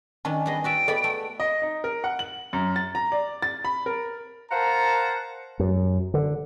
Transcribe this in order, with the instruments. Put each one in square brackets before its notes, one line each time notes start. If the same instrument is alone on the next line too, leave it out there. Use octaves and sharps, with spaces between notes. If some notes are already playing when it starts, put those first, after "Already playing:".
[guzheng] D#3 C#4 D4 [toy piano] A5
[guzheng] G3 B3 G#4 [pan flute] D#5
[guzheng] F#4 D5 E5 [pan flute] G5
[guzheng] B3 D5 B5 [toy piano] G#4 A4 D#5
[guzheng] A3
[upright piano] D#5
D#4
A#4
F#5
F#7
F#2
A6
A#5
D5
A6
B5
A#4
[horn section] A#4 C5 F5 F#5 A5 A#5
[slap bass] F#2
D3